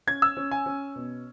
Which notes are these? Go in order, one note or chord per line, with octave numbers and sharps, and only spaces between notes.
C#4 G#6
E6
C#4
G#5
C#4
B2